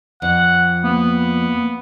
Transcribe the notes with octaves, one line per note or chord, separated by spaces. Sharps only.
F2 F#5
A#3 B3